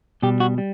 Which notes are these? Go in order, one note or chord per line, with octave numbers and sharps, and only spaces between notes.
B2 G3 G4
F#4
G3